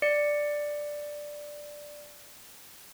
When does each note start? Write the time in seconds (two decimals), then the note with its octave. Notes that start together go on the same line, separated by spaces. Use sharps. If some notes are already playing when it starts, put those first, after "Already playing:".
0.02 D5 C#7